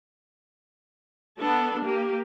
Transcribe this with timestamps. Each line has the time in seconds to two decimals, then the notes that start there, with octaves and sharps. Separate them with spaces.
1.39 B3 D4 A4
1.83 A#3 G4